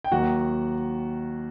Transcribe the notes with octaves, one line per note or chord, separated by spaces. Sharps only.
G5
D#2 D#3 F#3 F#4 F#5